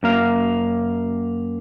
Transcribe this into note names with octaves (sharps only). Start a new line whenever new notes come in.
F#2 A#3 F5